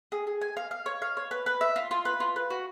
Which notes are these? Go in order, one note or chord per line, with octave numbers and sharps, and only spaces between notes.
G#4
G#4
G#5
F5
F5
C#5
F5
C#5
B4
B4
E5
F4
F4
B4
F4
B4
F#4